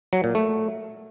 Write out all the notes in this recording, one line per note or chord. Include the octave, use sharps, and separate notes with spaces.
F#3
A#2
A3